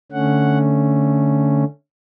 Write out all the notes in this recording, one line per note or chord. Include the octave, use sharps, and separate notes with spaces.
D3 A3 C#4 F#5